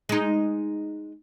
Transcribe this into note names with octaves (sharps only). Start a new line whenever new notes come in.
G#3 D#4